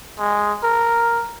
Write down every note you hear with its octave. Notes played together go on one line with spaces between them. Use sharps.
G#3
A#4